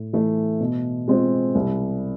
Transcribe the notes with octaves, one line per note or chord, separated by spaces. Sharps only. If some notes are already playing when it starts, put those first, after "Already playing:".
Already playing: A2
E3 A3
B2
G#3 C4 F4 G#4
C2